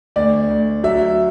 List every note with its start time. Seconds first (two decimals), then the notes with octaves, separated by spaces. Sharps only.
0.16 D2 D5
0.49 D2
0.84 F#3 E5